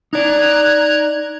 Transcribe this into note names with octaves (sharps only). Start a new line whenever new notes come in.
D#4 D5 A#5 F#6 G#6